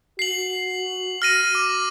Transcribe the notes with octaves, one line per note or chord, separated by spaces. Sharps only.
F#4 C7 F#7
F6 A#6 D#7
D6